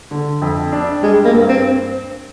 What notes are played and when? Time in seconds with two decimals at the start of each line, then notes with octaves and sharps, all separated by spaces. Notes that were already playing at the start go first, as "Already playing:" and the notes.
0.11 D3
0.42 F2
0.72 D4
1.03 G3 G#3
1.25 A#3
1.33 G2
1.49 C4